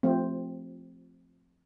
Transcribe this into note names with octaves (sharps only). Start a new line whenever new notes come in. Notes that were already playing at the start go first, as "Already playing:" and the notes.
F3 A3 C4